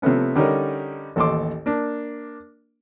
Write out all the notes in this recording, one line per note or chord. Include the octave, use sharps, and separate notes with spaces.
C3 F3 A3 B3 C#4
D3 G3 C#4 D#4 A#4
A1 D#2 A4 D#5 C6 D6
A#3 D4